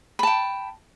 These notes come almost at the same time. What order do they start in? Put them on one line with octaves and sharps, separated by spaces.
B5 A5 G5